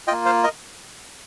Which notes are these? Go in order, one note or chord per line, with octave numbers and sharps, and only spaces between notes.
A#3 F4 D#5 G5
C5 F5
A#4 D#5